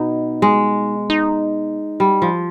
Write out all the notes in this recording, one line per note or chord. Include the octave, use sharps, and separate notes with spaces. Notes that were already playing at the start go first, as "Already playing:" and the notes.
Already playing: B2 D#4
G#3
D#4
G3
F3